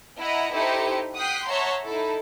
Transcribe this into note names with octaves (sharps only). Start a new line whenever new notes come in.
E4 D#5 F#5 A#5
D#4 E4 G4 A4 C5 C#7
F#5 G5 D#6 F#6 B6 C7
C#5 E5 F#5 A5 A#5 C6
D#4 E4 A4